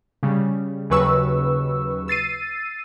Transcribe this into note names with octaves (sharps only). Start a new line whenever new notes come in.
C#3 G3
D#2 C#3 F#3 B4 C#6 E6
E6 A6 C7 D#7